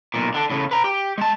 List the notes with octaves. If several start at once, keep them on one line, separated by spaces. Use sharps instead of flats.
B1 A#2
D3 D4
A2 C#3
B4 A#5
G4
G#3 A5